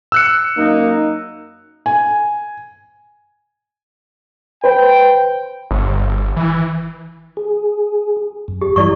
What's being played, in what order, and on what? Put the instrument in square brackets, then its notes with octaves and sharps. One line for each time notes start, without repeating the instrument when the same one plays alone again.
[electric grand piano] E6 F#6 C#7
[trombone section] F#2 A#3 D#4
[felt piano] G#5
[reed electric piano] B4 C5 [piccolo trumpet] G5
[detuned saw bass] G1
E3
[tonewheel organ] G#4
F#2
[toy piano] G4
[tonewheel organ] G2 E3 G3 [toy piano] E4 D5 C#6